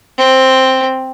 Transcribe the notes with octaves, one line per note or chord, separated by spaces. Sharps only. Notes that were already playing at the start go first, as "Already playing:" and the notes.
C4